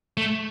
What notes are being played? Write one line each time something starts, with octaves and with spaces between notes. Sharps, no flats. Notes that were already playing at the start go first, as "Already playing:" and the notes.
A3